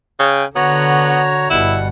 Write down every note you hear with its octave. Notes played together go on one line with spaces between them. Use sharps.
C#3 G5 G#5
D3 B3 F#4 C#5 A#5
G1 B2 G3 E4 F#5